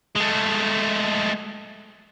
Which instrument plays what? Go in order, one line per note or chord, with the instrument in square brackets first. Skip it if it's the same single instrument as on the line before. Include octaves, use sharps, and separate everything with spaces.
[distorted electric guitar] G#3 A3